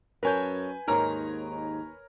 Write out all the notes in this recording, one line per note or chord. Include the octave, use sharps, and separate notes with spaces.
F#2 A#4 B4 C#5 G#5 A5 G6
D#2 G#2 D#3 A#4 C#5 A#5